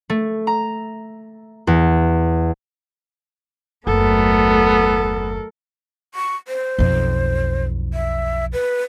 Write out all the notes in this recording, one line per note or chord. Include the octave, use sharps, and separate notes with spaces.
A3
A#5
E2
F#1 D#2 F#3 A3 B3 A4 A#4
C#6
C5
B1 F2
E5
B4